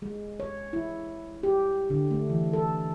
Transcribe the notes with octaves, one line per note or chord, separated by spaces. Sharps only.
G#3
C#5
E4
G4
D3
A3
E3
A4